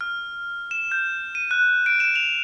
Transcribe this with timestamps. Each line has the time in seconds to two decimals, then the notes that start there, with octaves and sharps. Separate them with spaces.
0.01 F6
0.71 E7
0.92 G6
1.35 D#7
1.51 F#6
1.86 D7
2.00 E7
2.16 F7